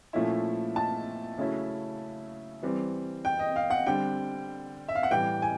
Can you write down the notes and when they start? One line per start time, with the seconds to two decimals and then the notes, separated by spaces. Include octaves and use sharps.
0.13 A#2 F3 A3 C#4 E4
0.76 A5
1.38 C#3 F#3 A3 C#4 E4
2.63 E3 G3 C4
3.25 G5
3.39 D#5
3.56 F5
3.70 F#5
3.86 D3 G3 C4 G5
4.88 E5
4.95 F5
5.03 F#5
5.11 A2 E3 G3 G5
5.42 G#5